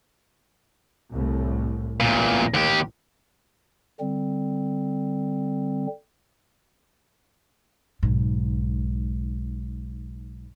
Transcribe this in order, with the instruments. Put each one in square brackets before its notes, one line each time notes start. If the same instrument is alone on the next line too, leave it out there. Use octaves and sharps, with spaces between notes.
[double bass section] C2 A2
[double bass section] A1 [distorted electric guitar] E2 A#2
[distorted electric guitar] D#2 G4
[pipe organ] D3 G3 C4
[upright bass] B1 G#2